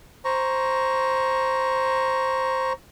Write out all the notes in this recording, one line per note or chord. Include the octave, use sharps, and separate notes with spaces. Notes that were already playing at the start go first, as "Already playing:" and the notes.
C5 A#5 C#6